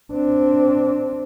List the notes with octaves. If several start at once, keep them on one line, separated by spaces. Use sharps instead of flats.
C4 D4